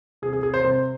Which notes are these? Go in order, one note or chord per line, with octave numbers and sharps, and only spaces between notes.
C3 G#4
G#4
C3 G#4
C5
C3 C5